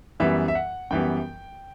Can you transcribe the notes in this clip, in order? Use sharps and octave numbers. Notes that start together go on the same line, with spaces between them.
F#2 E3 G3 B3 E5
E5
F#5
F#2 E3 G3 B3 G5